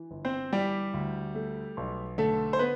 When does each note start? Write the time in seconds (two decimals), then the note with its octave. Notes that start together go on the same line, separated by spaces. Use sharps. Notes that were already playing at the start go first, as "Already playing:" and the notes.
Already playing: E3
0.11 G1
0.25 C4 C5
0.52 E3 G3 G4
0.94 D2
1.35 A3
1.77 B1
2.18 D3 A3 A4
2.53 C5
2.59 B3 B4